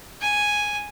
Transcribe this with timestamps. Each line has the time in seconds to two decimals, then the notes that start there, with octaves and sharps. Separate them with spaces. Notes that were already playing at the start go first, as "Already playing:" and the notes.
0.22 G#5